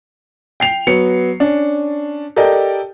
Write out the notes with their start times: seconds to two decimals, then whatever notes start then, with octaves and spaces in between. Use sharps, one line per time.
0.60 G5 C7 F7
0.87 F#3 B3 C#7
1.40 C#4 D4
2.36 G4 A4 A#4 D5 D#5 G5